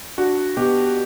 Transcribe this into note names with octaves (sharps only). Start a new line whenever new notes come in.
D4 F#4
B2 G4